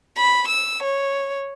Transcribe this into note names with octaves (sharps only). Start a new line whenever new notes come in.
B5
E6
C#5